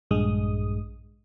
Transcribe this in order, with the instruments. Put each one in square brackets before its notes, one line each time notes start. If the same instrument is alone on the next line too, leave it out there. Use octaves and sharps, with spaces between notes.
[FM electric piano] A#1 G2 G#3 D#6